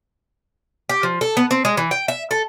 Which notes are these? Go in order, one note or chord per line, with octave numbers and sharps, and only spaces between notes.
G4
F3
A4
B3
C4
G#3
E3
G5
E5
A4